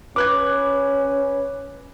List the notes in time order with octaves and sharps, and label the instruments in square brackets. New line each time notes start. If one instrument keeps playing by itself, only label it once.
[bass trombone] C#4 [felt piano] B4 F#6 G#6 [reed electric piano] D6